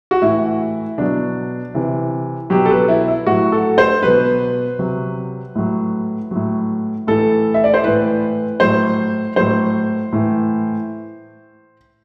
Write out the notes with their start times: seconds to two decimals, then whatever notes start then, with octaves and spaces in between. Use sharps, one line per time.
0.11 F#4
0.22 A2 E3 E4
0.98 B2 F#3 D4
1.74 C3 E3
2.50 B2 F#3 G4
2.65 A4
2.70 B4
2.88 E4
3.08 E4
3.26 A2 F#3 F#4
3.52 A4
3.78 C5
4.02 B2 F#3 B4
4.79 C3 F#3
5.55 A2 F#3
6.31 A2 F#3
7.07 A2 E3 A4
7.54 E5
7.64 D5
7.74 C5
7.84 A2 E3 B4
8.60 A2 F#3 C5
9.36 A2 F#3 C5
10.13 A2 E3